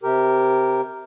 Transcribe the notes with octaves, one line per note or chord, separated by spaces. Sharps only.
C3 G4 A#4